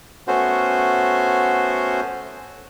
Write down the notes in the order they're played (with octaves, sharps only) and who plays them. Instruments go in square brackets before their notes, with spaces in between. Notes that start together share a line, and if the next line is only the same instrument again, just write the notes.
[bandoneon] A3 B3 C#4 F#4 C5